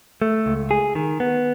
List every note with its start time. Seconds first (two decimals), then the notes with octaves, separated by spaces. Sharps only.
0.22 A3
0.46 C#2
0.71 G#4
0.95 D#3
1.20 B3